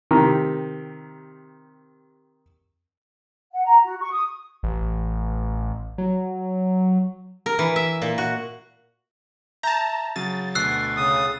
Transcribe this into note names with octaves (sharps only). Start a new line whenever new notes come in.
C3 D#3 G4 A#4
F#5
A#5
F#4
C#6
D#6
A1
F#3
A#4
E3
E5
A#2
F#4
E5 A5 A#5 G6 A#6
C#3 F#3 A6 D#7
D2 B2 E6 F#6 C7
C#3 D#6